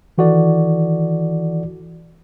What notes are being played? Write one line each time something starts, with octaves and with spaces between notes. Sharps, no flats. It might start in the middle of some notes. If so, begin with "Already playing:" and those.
D#3 E3 F#4 A4 D5